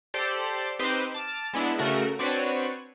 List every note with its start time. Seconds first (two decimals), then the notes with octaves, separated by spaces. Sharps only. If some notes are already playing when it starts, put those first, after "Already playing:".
0.14 G4 A4 C5 D5
0.79 C4 D#4 G4 B4 C5
1.14 A5 D6 F6
1.53 G#3 B3 D4 E4
1.78 C#3 A3 F#4 A#4
2.19 C4 D4 F#4 B4 C#5